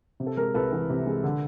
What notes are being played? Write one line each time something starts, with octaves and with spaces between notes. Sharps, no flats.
C3
A4
G#3 A#4
C2 A4 B4
E3
C3
G#3
D3